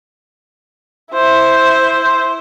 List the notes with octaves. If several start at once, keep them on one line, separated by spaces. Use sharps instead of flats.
E4 C5